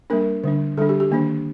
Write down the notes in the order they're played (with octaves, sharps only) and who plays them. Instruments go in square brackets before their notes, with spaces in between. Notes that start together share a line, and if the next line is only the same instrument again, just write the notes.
[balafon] G3 A#3 D4 A#4
D3 G3 D4
D3 G3 D4 A4
G4
G4
D#3 A#3 D4